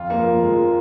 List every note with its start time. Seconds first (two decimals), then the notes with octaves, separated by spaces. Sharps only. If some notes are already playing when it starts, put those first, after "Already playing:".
Already playing: F2 F4
0.10 A#3
0.18 F3
0.43 F2 G#3